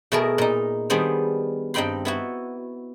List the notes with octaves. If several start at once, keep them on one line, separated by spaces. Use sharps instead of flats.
B2 A3 E4 G#4 A#4
A#2 D#4
D#3 G3 B3 D4 G#4 C5
G2 C4 D#4 G5 B5 C6
B3 E4 F#4